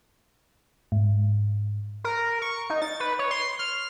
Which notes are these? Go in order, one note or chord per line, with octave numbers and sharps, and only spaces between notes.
G#2
A#4
C#6
D#4
A6
B4
C#5
C6
F6